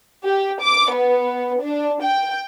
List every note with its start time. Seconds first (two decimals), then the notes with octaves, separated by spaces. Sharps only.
0.24 G4
0.61 D6
0.93 B3
1.62 D4
2.02 G5